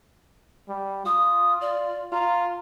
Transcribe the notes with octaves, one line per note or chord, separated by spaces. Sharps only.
G3
F4 D#6
D5
F4 A#5